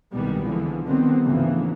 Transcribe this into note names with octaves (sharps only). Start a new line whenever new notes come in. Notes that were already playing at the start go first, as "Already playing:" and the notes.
C2 B2 D#3 G3 G#3 B3
D3 E3 F3
D3 D#3 G3 B3 C4
D2 G#2 C#3 E3 F3 A#3